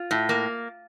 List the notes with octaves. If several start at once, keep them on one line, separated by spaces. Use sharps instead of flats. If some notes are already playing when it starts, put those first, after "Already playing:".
Already playing: F4
A2
A#3